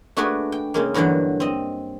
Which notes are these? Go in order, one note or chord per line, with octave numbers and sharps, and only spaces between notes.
A3 D4 F#4 G#4 B4 D5
G5
C#3 G#3 A#3
E2 G2 D3 E3 F#3
C4 D#5